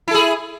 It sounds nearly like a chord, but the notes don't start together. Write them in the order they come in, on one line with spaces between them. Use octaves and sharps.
E4 A4 G#4